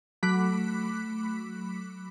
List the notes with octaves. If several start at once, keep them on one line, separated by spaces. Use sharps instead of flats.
F#3 A3 B5 D6 F#6 B6